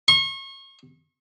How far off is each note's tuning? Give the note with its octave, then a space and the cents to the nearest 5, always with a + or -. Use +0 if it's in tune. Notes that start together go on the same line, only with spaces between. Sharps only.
C#6 -35